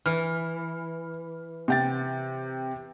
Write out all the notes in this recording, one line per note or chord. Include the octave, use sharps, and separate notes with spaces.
E3 F6
C3 G5 A6